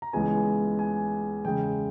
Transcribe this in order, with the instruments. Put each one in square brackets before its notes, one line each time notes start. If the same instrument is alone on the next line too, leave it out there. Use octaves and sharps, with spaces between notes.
[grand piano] A#5
C#2 C#3 E3 G#3 B3 G#5
G#5
E2 C#3 G#3 G5